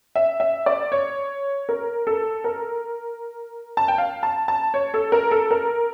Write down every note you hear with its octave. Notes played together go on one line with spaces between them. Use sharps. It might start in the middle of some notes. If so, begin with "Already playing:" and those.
E5
E5
D5
C#5
A#4
A4
A#4
A5
G5
F5
A5
A5
C#5
A4
A#4
A4
A#4